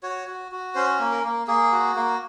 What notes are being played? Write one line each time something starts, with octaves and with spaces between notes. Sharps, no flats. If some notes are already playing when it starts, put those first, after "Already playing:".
F#4 C#5
F#4
F#4
C#4 C5
A#3
A#4
A#3
A#3 G#4
F#4
A#3